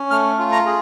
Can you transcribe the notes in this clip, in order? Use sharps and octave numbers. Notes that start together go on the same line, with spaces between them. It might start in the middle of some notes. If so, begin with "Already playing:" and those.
Already playing: C#4
A3 F6
F4
A#5
G#4